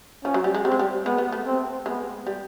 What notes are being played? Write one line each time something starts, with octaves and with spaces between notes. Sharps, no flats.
F3 C#4
F#3
G3
G#3
G3 C4
G#3
G3
G#3 B3
B3
A3
C4
G#3 B3
G3